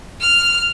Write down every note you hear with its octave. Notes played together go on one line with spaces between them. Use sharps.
F6